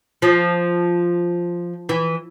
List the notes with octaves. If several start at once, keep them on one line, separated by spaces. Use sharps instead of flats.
F3
E3